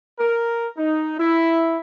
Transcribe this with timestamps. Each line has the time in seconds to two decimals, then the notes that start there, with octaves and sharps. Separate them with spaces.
0.20 A#4
0.78 D#4
1.19 E4